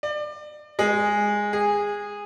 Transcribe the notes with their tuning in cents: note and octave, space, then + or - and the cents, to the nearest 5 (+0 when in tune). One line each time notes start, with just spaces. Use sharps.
D5 +30
G#3 -10
G#4 -15